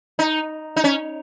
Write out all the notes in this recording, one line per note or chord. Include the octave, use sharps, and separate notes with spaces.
D#4
D#4
C#4